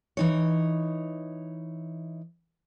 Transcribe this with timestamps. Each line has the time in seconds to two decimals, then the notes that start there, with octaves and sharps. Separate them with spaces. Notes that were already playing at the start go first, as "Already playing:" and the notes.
0.17 E3 D#4 C#5